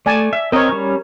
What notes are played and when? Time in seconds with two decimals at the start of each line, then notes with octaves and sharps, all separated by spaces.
0.06 A3 D5 G#5 A5
0.33 E5
0.52 C4 A#4 C#5 D#5
0.69 G3 C#4